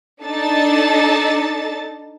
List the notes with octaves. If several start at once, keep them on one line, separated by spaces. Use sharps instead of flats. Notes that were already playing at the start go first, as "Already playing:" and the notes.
D4 D#4 A4 A5 A6